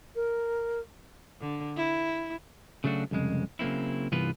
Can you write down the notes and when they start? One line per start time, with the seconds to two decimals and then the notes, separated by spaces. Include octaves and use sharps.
0.15 A#4
1.41 D3
1.77 E4
2.84 C#3 F#3 A3 D4 F#4
3.11 C2 F2 C#3 G#3
3.59 C#3 F#3 A#3 C4 E4
4.12 C2 G2 E3 B3 F4 B4